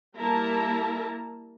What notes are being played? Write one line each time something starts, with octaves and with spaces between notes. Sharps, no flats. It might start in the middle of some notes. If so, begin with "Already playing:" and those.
G3 A#3 E4 A#4 A5 A#5